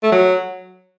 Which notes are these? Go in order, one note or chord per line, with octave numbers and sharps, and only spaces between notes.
A3
F#3